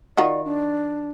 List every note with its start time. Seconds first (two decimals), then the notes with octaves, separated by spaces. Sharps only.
0.17 D#3 F4 F#4 D5
0.45 D4